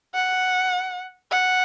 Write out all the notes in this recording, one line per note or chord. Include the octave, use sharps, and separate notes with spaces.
F#5
F#5